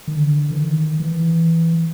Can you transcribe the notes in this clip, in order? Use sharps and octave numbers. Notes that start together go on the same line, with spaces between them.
D#3
D3
E3
D#3
E3